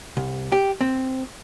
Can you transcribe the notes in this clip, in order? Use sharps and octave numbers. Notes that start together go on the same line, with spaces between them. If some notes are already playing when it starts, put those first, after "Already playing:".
C2
G4
C4